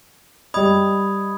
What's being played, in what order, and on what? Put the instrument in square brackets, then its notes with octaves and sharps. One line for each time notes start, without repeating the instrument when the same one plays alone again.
[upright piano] G3 D#5 [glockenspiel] B5 D#6 G#6